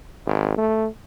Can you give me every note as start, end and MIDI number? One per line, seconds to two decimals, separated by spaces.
0.26 0.56 32
0.58 0.86 57